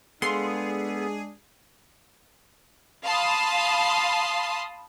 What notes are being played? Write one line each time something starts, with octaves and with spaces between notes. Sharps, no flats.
G#3 B3 D4 G#4 A4 F5 C6
F5 A5 B5 C6 D#6